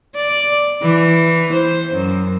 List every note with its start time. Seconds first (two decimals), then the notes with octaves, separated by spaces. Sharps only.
0.16 D5
0.82 E3
1.53 C5
1.94 F#2